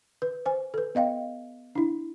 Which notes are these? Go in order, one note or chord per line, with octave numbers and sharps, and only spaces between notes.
B4
C5 G#5
A4 B4
B3 D#5 F5 G5
D4 E4